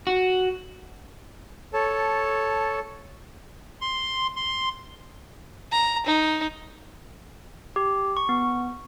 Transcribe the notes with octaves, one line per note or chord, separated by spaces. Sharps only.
F#4
A4 C#5 A5
C6
C6
A#5
D#4
G4
C#6
B3